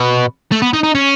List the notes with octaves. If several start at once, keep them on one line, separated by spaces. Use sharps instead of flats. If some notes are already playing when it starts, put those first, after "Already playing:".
Already playing: B2
A3
B3
D#4
D#4
C#4